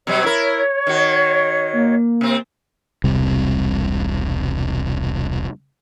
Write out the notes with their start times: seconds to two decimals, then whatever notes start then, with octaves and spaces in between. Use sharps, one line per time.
0.07 B2 F#3 G3 C#5
0.24 E4 A#4
0.87 D#3 F#4
1.73 A#3
2.21 C3 C4
3.04 E1 C2 C3 G3